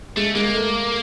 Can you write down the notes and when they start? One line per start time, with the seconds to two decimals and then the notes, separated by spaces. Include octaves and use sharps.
0.17 G#3 A3
0.35 G#3 A#3
0.54 A3